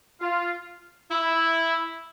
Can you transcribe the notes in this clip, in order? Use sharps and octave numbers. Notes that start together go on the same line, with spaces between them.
F4
E4